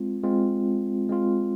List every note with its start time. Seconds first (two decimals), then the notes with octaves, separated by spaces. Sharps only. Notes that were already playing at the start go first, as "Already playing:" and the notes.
Already playing: G#3 C4 F4
0.24 G#3 C4 F4
1.09 G#3 C4 F4